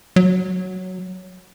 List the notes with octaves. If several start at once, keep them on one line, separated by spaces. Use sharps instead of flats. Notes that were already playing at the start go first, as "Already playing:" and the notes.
F#3